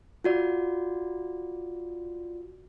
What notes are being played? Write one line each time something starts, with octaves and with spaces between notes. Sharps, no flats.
F4 F#4 D5